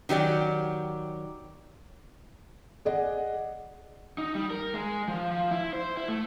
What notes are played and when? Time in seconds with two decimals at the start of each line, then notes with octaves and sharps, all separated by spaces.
0.09 D#3 F#3 G4 D5
2.85 G#4 D5 D#5 F#5
4.18 D#4
4.35 G3
4.51 A#4
4.74 G#3
5.09 F3
5.31 F3
5.51 E4
5.73 C5
5.97 E4
6.08 A3